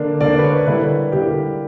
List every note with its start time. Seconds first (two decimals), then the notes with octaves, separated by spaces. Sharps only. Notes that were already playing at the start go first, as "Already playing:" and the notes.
Already playing: D3 A#3 D4
0.21 D3 A#3 D4 D5
0.38 B4
0.44 C#5
0.67 D3 G3 A#3 E4 B4
1.12 D3 G3 A#3 E4 G4